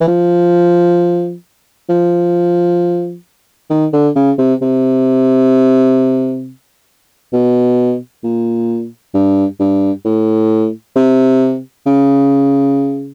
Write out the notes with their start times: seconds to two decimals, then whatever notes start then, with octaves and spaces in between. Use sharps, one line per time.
0.01 E3
0.08 F3
1.89 F3
3.70 D#3
3.93 D3
4.16 C#3
4.38 C3
4.62 C3
7.33 B2
8.24 A#2
9.14 G2
9.60 G2
10.05 A2
10.96 C3
11.86 C#3